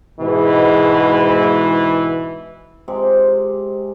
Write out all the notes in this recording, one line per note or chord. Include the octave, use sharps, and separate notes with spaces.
G#2 B2 E3
C3 G#3 D6